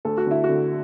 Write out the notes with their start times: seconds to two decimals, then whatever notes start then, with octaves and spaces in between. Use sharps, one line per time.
0.05 D2 A4
0.17 F#4
0.27 D3 E4
0.44 F#4
0.49 D3